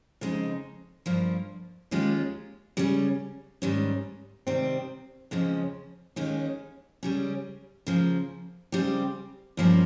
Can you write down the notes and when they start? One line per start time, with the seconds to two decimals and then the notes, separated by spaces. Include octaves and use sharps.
0.21 F2 C#3 G#3 D#4
1.06 G2 F3 A#3
1.91 D#2 D#3 G#3 C#4 F4
2.77 C#3 G3 C#4
3.62 G#2 D#3 G3 C#4
4.47 C3 D#3 G3 C4
5.31 F2 C#3 F3 G#3 C#4
6.16 D#2 D#3 G#3 C#4
7.03 C#3 G3 C#4
7.87 C#3 F3 A#3
8.72 C#3 G3 C4 G4
9.57 G2 F3 A#3 C#4 G4